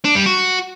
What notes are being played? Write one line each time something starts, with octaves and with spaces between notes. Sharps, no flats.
D4
G3
F#4